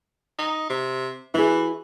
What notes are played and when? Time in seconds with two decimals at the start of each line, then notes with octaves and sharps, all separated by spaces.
0.39 D#4
0.70 C3
1.34 E3 E4 F#4 G#4